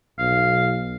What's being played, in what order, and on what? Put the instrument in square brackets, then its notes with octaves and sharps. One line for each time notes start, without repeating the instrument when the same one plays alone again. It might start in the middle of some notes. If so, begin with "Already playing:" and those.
[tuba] B1 [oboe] F5